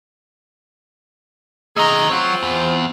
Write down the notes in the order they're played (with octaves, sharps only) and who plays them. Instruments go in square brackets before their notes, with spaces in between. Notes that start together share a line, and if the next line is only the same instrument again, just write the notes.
[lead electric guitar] D#3 A3 [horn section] G#4 D#5 A#5
[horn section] C4 F4 [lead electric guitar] F#4 C#5
[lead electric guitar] E2